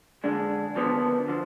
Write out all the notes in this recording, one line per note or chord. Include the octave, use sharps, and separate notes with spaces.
F2 D3 G#3 D4
D#2 D3 F3 B3
D3 F3